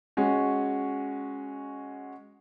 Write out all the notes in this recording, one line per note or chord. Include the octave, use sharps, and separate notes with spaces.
G#3 C#4 F#4